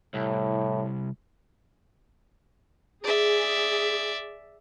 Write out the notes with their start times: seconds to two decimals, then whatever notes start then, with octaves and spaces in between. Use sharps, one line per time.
0.15 C2 A2
3.04 G#4 D5 E5